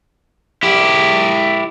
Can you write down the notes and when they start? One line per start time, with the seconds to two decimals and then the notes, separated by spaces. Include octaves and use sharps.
0.63 E4 G4